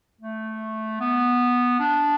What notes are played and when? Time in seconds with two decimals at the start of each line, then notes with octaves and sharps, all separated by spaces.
0.21 A3
1.01 B3
1.80 D4